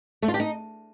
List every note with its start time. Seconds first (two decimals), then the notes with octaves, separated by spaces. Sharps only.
0.22 A3
0.28 F4
0.34 G4
0.40 D#4